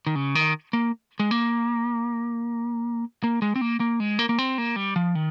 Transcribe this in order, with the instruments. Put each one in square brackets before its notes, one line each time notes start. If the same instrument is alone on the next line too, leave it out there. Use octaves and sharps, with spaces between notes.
[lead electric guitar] D#3
C#3
D#3
A#3
G#3
A#3
A#3
G#3
C4
A#3
A#3
G#3
A#3
A#3
C4
A#3
G3
F3
D#3